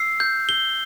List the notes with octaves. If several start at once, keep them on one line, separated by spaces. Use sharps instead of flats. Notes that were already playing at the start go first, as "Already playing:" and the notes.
Already playing: E6 C7
G6
G7